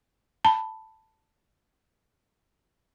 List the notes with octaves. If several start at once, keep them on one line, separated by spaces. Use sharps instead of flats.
A5 B5